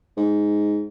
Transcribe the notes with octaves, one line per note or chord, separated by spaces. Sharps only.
G#2